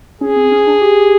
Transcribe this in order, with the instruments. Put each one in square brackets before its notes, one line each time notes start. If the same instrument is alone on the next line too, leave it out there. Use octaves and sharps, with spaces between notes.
[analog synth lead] C#4 [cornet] G#4
[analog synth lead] C4
C#4
D4
G4